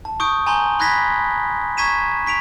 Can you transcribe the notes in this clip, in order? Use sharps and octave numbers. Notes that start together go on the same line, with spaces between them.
A5
C#6 D#6 G6 D7
G#5 A#5 C6 G6 G7
B5 F#6 G#6 A#6 B6
A#5 C#6 G#6 B6 D#7 E7
C#6 B6 D7 F7